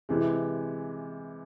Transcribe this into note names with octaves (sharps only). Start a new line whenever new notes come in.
C3 E3 G#3